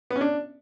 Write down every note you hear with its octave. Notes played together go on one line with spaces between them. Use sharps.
B3
C#4
D4